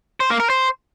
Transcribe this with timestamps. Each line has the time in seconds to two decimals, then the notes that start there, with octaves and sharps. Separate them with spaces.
0.20 C5
0.30 A#3
0.40 A#4
0.50 C5